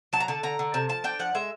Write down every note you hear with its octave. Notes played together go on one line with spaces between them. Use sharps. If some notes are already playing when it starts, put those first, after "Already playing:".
F#3 A5
A#5
D3 A5
D3 A#5
D3
C3 A5
F3 A5
D4 G5
F3 F#5
G#3 E5